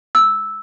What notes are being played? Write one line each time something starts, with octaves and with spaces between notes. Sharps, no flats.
E6